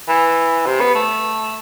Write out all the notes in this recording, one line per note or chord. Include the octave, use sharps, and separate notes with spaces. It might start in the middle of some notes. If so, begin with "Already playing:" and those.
E3
C3
B3
A3